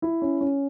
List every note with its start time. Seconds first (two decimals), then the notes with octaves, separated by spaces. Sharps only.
0.02 E4
0.22 C#4
0.41 C#4